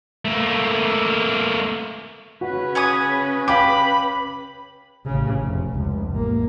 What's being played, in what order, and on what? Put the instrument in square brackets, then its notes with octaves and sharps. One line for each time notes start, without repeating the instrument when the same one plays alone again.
[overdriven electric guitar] A3 A#3
[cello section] C#3 C#4 B4 [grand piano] F#4 F#5
[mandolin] C#5 G#5 D#6
[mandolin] G4 [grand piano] F5 D6 [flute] B5
[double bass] A1 C#3
F1
F1 C#2
A1 A#3